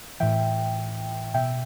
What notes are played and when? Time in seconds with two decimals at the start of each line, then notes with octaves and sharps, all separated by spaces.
0.20 A2 E3 E5 G5
1.34 B2 E5 G5